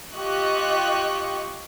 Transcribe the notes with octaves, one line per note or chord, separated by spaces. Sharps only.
F4 G4 D#5 C#6 F#6